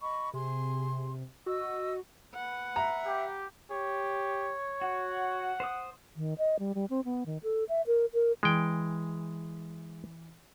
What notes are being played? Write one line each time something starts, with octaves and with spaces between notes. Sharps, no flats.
D#5 B5 C#6
C3 G#4 C6
F#4 D#5 E6
B4 F#5
E5 A#5
G4
G4 C#5
F#4 F#5
C5 D#6
D#3
D#5
G3
G3
C4
B3
D#3
A4
E5
A#4
A#4
E3 G#3 G5